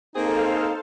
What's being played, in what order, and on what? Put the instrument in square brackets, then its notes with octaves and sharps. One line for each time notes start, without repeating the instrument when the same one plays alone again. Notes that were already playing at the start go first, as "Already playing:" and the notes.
[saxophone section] A#3 C4 G#4 [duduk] D#4 [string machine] A4 C5 F5